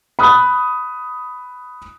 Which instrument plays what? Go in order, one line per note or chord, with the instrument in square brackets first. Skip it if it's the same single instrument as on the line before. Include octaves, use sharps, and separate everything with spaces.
[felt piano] B5 D#6 F#6